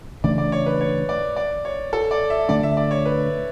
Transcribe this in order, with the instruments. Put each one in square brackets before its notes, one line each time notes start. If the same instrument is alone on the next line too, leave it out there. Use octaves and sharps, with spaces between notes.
[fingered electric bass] C#3 E3 A3 D4 [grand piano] D5
[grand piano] D5
C#5
B4
C#5
D5
D5
C#5
A4
D5
E5
[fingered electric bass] D3 A3 D4 [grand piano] D5
[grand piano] E5
D5
C#5
B4